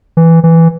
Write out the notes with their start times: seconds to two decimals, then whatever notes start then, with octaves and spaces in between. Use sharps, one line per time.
0.17 E3
0.44 E3